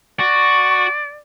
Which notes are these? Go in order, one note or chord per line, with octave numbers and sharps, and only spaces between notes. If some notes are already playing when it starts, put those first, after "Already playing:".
F#4 D5 C#6